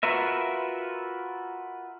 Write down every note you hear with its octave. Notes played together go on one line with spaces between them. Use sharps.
F4 F#4 A#4 B4 E5